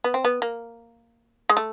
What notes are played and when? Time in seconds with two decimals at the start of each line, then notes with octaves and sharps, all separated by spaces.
0.04 B3
0.14 C4
0.25 B3
0.42 A#3
1.50 G#3
1.57 A3